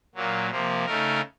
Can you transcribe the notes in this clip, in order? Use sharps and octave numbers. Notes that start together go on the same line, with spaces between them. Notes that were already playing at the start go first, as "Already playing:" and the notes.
A#2 F#3 A#3
C3 F3 A#3
C#3 A3 D#4 A#4